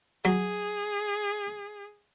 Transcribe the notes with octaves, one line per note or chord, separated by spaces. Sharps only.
F#3 G#4